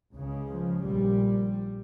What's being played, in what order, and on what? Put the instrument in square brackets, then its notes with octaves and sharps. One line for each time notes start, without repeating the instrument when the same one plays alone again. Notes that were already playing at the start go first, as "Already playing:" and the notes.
[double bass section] C#2 C#3
F3
A#1 A#2 G3